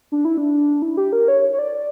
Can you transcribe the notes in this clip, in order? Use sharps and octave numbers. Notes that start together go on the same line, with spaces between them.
D4
E4
D4
E4
G4
A#4
C#5
C#5
D5